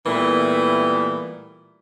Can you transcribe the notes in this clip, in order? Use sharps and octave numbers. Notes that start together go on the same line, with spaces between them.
A#2 E3 G3 A3 B3 A#4